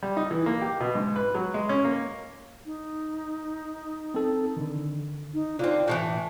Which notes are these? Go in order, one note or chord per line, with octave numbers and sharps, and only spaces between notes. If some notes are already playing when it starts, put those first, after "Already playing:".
G3
D#4
E3
A#3
G4
B2
G#2
B4
F#3
G#3
C#4
A#3
D#4
C4 A4
D3 D#3
D#4
D3 C4 F4
A2 D#3 E3 A5